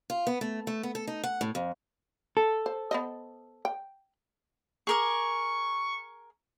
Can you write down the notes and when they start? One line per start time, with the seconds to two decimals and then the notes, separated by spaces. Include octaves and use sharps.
0.10 F4
0.27 B3
0.41 A3
0.67 A3
0.83 B3
0.95 A4
1.07 D#4
1.23 F#5
1.41 A2
1.55 F2
2.37 A4
2.66 C5
2.91 B3 C5 D#5
3.65 G5
4.87 G#4 A#4 C#6 D6